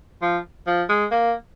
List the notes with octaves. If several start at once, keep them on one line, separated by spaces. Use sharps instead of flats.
F3
F3
G#3
A#3